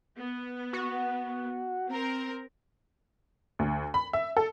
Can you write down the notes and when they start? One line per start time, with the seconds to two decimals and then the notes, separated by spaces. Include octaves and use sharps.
0.16 B3
0.73 F#4
1.90 C4 A#4
3.59 D2
3.94 B5
4.13 E5
4.37 A4